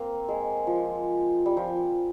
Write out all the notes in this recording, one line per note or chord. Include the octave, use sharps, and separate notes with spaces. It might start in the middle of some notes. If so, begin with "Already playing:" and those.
Already playing: A#3 C4
G#3
F3
G3
F3